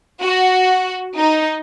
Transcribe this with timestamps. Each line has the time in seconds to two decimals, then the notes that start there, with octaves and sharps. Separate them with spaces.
0.22 F#4
1.19 D#4